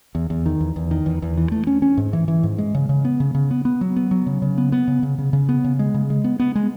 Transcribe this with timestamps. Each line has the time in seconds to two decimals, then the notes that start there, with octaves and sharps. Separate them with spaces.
0.15 E2
0.30 E2
0.46 D#3
0.61 E2
0.76 E2
0.91 D#3
1.06 E2
1.22 E2
1.37 E3
1.52 A3
1.67 C#4
1.82 C#4
1.97 G#2
2.13 E3
2.28 E3
2.43 G#2
2.58 G#3
2.74 C#3
2.89 C#3
3.05 B3
3.20 C#3
3.35 C#3
3.51 B3
3.65 B3
3.81 F#3
3.96 B3
4.11 F#3
4.27 C#3
4.42 C#3
4.58 B3
4.72 B3
4.88 C#3
5.03 C#3
5.18 C#3
5.33 C#3
5.49 B3
5.64 C#3
5.79 G#3
5.94 C#3
6.10 G#3
6.24 B3
6.39 B3
6.55 G#3